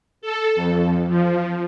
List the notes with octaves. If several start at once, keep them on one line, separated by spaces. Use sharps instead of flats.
A4
F2
F3